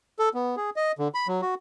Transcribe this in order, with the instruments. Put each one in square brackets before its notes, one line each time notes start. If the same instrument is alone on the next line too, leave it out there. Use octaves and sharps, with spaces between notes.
[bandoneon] A4
B3
G#4
D#5
D3
B5
F#3
F#4